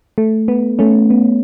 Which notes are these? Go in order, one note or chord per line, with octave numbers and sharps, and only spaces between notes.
A3
B3
A3 C#4
B3